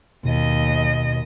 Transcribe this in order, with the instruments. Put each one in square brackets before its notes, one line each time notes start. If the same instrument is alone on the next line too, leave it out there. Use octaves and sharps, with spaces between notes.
[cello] D#2 D#5 [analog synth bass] B2